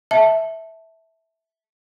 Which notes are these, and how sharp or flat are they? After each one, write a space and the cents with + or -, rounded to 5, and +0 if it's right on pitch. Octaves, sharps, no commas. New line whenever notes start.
E5 -15 A5 +0